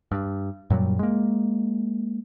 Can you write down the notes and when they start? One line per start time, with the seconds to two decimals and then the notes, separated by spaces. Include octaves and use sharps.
0.12 G2
0.70 F#2 A#2 F#3 G3
0.99 G#3 A#3